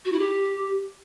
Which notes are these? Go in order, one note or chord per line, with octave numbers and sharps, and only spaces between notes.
F#4
E4
G4